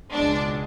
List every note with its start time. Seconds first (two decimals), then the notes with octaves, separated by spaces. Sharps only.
0.13 C#2 B2 G#3 D4